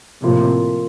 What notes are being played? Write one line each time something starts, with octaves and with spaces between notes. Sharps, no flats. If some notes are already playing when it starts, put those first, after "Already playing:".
A2 C3 F3 A#3 F4 A#4